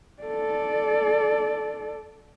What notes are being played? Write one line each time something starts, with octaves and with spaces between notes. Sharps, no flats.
A4 D5